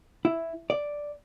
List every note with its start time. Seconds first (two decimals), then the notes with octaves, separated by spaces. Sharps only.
0.25 E4
0.70 D5